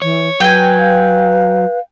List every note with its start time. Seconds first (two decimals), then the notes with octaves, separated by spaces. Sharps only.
0.02 E3 C#5
0.40 F#3 B4 G5 G#5
0.79 F5